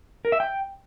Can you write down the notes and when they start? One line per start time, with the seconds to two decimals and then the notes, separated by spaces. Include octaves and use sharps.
0.25 A#4
0.32 E5
0.40 G5